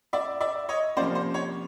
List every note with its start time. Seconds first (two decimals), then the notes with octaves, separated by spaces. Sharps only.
0.13 D5 E5
0.41 D5 E5
0.69 C#5 D#5
0.96 C3 F3 A#3 C#4 C5 D5
1.15 C5
1.34 C#5